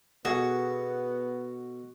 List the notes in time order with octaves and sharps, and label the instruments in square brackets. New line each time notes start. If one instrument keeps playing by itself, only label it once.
[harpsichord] B2 A4 [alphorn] B3 [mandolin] F#4 [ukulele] G#4 F#5